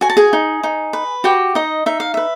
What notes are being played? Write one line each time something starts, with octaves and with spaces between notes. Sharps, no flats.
F#4 G#5
A5
G#4 G#5
D#4
D#4
B4
F#4 G4 G5
D#4 D#5
D#4 E5
F5
B4 E5